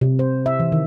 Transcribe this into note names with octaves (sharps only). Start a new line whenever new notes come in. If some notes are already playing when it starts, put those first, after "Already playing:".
C3
C5
E5
E3
D#3